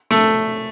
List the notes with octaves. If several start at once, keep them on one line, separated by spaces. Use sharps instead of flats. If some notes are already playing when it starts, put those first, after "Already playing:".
A3